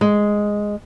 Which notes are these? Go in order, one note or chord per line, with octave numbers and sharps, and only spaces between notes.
G#3